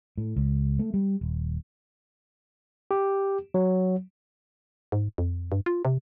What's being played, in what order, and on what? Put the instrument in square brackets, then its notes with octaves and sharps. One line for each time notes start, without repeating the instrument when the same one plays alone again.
[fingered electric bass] A2
C#2
A3
G3
D#1
[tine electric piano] G4
F#3
[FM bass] G#2
F2
G2
F4
C3